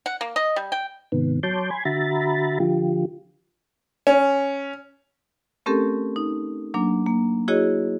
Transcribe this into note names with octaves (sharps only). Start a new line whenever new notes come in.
F#5
A#3
D#5
G3
G5
G#2 C3 D#3 B3
F#3 C#5 A5 C6 D6 G6
G#5 B5 C6 G#6
D3 F#4 E5 A#5 B5 A6
D3 F3 F4 G4
C#4
A3 C4 C#4 G4 A4 A#4
D#4
F#3 A#3 D4
A#3
E4 F#4 G#4 C#5 D#5